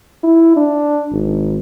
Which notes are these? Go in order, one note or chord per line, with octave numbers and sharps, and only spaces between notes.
E4
D4
G#1